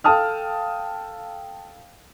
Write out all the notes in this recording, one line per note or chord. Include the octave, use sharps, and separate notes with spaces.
A4 F5 G5 A5 D#6 F6